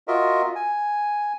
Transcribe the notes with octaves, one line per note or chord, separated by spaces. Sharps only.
F4 F#4 A#4 D#5 E5
G#5